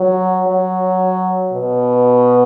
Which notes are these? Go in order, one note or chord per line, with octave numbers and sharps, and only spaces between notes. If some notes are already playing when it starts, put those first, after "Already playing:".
Already playing: F#3
F#3
B2